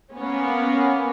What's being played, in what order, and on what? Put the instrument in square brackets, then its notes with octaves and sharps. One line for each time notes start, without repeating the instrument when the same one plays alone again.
[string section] A#3 B3 C#4